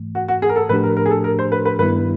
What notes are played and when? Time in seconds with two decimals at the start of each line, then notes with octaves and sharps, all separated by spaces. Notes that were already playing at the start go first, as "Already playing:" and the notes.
Already playing: G#2 E3 A3
0.15 F#4
0.28 F#4
0.42 G#4
0.49 A#4
0.56 A4
0.69 A2 F3 A3 D4 G4 B4
0.84 A#4
0.97 A#4
1.06 G#4
1.10 A4
1.24 A#4
1.39 C5
1.52 B4
1.65 B4
1.79 G2 D#3 G3 B3 E4 B4